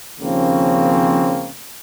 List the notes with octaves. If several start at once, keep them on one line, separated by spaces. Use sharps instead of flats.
D#2 C#3 F3 A#3 C4 C#4